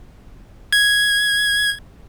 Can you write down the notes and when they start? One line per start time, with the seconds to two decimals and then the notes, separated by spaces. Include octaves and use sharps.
0.72 G#6